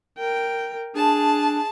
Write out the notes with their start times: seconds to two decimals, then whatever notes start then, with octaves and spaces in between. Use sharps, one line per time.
0.18 A#4 G5
0.96 D4 G#4 A5